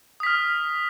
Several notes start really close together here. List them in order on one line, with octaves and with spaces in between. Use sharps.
D#6 B6 F6